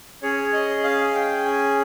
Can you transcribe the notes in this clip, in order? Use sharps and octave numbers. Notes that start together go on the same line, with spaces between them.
C#4 G#4 C#5
D#5
F5
G5
G#5